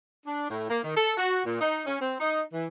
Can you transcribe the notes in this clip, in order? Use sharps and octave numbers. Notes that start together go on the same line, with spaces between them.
D4
A2
A#3
D#3
A4
F#4
A#2
D#4
C#4
C4
D#4
E3